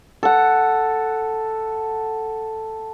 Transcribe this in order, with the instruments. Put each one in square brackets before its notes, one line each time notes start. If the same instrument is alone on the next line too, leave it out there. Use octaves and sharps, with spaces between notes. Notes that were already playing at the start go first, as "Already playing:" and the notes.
[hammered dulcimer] A4 F#5